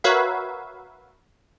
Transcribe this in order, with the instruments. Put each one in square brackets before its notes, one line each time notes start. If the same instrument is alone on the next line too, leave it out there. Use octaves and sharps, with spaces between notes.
[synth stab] F#4 A#4 B4 C#5 E5 F5